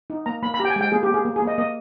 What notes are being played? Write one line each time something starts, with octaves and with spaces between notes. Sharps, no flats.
D#4
A#3 A#5
A#3 B5
B5
G4 A#5
G5
G#5
G#3 G5
A#3 G#4
G4
A#3
G#4
A#3
G#4
A#3
D#5
A#3 D#5